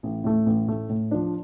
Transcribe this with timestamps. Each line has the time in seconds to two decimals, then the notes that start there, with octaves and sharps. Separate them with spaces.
0.03 A1
0.24 A2 A3
0.46 A1
0.67 A2 A3
0.89 A2
1.11 F3 D4